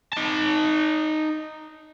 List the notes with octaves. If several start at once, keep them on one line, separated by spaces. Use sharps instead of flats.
D#4 A5